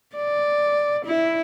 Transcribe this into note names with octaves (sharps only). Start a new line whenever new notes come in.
D5
E4